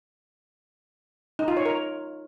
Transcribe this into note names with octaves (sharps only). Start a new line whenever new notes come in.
D#4
F4
C#5
A#4